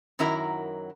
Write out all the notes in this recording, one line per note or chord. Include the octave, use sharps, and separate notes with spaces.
F#2 D#3 F#3 E4 A#4 A#5